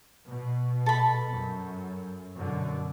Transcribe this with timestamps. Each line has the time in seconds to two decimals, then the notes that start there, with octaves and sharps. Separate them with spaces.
0.27 B2
0.86 A4 B5
1.32 F#2
2.36 F#2 B2 D3